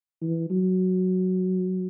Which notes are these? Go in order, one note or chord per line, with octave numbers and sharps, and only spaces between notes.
E3
F#3